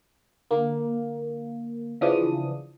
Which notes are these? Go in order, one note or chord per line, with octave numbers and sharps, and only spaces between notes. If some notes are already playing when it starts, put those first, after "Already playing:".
D3 A#3
C#3 E3 F3 D4 D#6